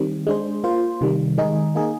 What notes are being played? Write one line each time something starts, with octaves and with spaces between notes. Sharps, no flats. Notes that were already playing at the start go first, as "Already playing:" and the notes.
Already playing: D#3 G3 C4
G#3 D4 G#4 C5
A#3 F4 C5
C3 D#3 G3
D#3 G#3 D#4 G#4
A#3 D#4 G#4